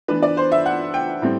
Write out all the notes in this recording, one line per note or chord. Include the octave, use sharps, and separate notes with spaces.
E3 B3 D4 B4
D5
C5
E5
F#5
G5
A2 G3 C4